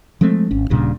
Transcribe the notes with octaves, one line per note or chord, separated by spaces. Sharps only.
F3 G#3 A3 C4
G#1 C#4
D#1 G2 A#2 C#3